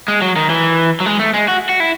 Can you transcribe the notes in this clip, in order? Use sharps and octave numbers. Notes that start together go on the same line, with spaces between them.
G#3
F#3
D#3
E3
F#3
G#3
A3
G#3
F#4
F#4
E4